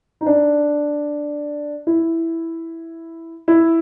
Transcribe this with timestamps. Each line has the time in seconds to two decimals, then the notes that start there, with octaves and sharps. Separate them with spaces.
0.21 D#4
0.26 D4
1.87 E4
3.48 E4